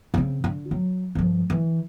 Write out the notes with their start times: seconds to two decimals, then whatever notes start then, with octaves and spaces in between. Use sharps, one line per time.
0.14 C#3 C4
0.44 D3
0.71 F#3
1.15 G2 F3
1.50 E3